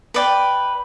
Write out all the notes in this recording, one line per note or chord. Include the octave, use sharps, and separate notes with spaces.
B4 D5 G5